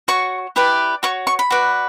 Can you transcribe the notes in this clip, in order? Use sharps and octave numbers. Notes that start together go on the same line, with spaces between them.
F#4 C#5 C#6
E4 G4 B4 D5
F#4 C#5 C#6
C#6
B5
F#4 B4 D5